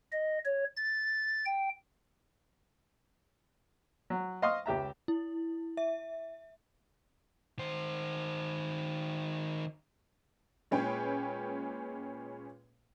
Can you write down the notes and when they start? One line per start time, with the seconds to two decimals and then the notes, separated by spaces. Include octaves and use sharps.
0.12 D#5
0.45 C#5
0.76 A6
1.46 G5
4.10 F#3
4.42 D#5 F5 C6 C#6 D#6
4.66 C#2 G4 E5 A#5
5.08 E4
5.77 E5
7.59 D#3 C5
10.71 A#2 G#3 C#4 B4 G5